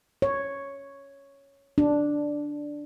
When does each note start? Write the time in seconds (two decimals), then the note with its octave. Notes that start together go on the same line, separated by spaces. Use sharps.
0.22 C#5
1.78 D4